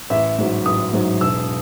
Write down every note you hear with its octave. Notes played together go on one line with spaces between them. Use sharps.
A1 E5
G#2 F#3
A1 D#6
G#2 F#3
E1 E6